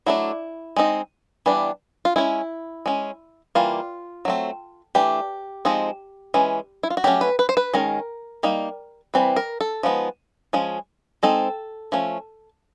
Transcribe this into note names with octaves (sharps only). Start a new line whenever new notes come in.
F#3 A3 D4 E4
G#3 C4 D#4
E3 G3 B3 D4
F4
G#3 C#4 E4
G#3 C#4
E3 G3 A#3 F4
F#3 A3 C4
E3 A3 D4 G4
F3 G#3 C4 D#4
E3 G#3 C#4
E4
F4
F#4
F#3 A3 C#4 G4
B4
B4
C5
B4
D#3 G#3 C#4 A#4
G3 A#3 D#4
E3 G3 C4 B4
A#4
A4
F3 G#3 B3 D#4
F3 G#3 C#4
G#3 C4 D#4 A4
F3 A3 C#4